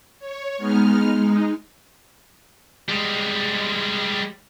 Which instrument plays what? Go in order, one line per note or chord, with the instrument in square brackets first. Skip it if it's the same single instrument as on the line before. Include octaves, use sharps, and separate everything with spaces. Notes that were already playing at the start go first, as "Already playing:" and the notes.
[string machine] C#5
G#3 B3 D#4 F6
G#3 D#4
[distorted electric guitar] G3 G#3